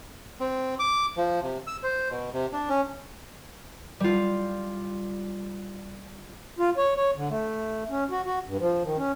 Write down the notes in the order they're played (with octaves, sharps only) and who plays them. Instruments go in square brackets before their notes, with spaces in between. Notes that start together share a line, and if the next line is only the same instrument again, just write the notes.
[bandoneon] C4
D6
F3
C3
E6
C5
B2
C3
D4
C#4
[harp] G3 F4
[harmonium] F4
C#5
C#5
D3
A3
C#4
F#4
F#4
G2
F3
D#3
C#4